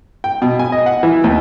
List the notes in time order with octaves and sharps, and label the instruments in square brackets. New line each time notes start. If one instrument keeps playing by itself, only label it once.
[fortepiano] G5
B2
G#5
D#5
F#5
E3
D#2